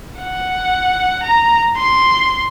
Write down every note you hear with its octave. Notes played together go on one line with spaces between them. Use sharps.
F#5
A#5
C6